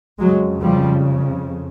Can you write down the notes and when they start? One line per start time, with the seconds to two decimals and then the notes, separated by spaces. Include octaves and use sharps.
0.19 F2 C#3 F#3 G#3
0.61 F3 G3